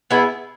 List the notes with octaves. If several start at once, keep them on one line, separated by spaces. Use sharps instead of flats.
B3 E4 G#4